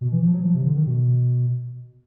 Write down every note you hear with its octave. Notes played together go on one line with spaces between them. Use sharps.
B2
E3
F3
F#3
F3
C3
D3
D#3
B2